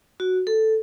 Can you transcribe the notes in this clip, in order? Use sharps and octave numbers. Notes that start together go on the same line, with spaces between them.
F#4
A4